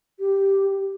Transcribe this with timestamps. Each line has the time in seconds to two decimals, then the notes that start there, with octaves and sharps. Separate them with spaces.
0.20 G4